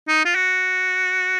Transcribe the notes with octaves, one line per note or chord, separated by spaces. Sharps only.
D#4
F4
F#4